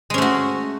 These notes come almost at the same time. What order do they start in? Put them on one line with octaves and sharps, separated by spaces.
G#3 C#4 A3 F#4